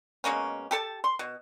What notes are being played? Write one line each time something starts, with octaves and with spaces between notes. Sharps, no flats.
B2 G#3 A#3 C#4
G4 A4 A5
C6
B2